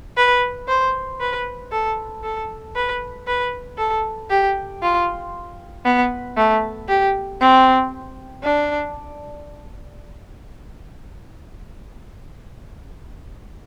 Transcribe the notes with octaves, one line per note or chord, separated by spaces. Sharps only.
B4
C5
B4
A4
A4
B4
B4
A4
G4
F4
B3
A3
G4
C4
D4